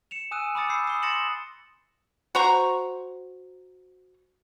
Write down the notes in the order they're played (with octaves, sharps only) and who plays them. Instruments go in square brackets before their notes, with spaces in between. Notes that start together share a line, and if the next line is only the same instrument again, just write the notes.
[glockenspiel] C#7 E7 F7
G#5 D#6 E6 F#6 D#7
B5 D6 D#6 A6 C#7
E6 G6 C7
D#6 G7
C6 A6 A#6 C#7 E7 F#7
[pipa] F#4 C5 A#5 C#6